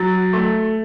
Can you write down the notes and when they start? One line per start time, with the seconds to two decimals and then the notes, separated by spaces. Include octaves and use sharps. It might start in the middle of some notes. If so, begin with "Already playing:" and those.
Already playing: F#3 A6
0.33 A3